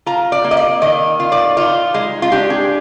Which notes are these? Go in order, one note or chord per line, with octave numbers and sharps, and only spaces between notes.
F4 A#5
D5
A#3
D#5
D5
D#3 D#5
F4
D5
D#4 F4
G#3
F4
D4 G4
G#4